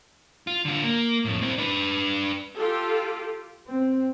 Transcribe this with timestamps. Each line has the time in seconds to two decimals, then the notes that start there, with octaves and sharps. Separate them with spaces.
0.47 F4
0.65 D3 F4
0.83 A#3
1.25 F2 A2
1.42 C4 E4
1.58 D4 B4
2.55 F4 G4 A4
3.67 C4